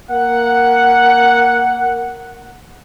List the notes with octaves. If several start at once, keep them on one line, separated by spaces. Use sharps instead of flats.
A#3 F#5